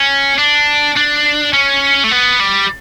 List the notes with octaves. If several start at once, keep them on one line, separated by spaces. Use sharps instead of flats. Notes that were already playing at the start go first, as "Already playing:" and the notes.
Already playing: C#4
D4
D4
C#4
A3
B3
G3